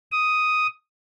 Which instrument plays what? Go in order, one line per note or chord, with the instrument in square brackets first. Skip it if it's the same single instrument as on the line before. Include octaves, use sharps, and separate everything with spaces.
[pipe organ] D#6